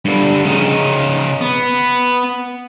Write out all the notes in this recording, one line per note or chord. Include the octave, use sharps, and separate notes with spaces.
G2 D3
C#3 D#4
B3